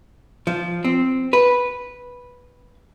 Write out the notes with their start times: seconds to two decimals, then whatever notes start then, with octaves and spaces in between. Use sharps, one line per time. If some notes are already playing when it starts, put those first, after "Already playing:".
0.47 F3
0.85 C4
1.33 B4